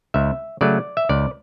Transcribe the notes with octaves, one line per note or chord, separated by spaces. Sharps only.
C#2 E5
C#3 F#3 A3 D5
E5
C#2 D5